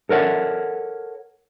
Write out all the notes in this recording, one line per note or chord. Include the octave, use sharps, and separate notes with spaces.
A4 A#4 C#5 F#5